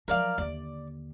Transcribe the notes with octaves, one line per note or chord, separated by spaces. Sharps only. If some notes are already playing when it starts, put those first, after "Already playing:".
F3 F#3 A#4 D5 F5
D#2 D3 D5